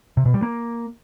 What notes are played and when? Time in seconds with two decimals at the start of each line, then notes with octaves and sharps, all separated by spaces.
0.17 C3
0.26 B2
0.34 G3
0.42 A#3